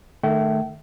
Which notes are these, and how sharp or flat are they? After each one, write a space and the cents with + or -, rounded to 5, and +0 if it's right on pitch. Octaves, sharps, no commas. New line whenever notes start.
D#3 -20 A3 +0 G5 -40